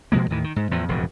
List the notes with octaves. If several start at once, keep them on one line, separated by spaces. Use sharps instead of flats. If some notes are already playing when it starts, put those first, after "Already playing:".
B2 F3 G#3 A#3
D#2 A2 D#3 E3
D#3
G#2
E2 A2 F3
E1 F2 A2 C#3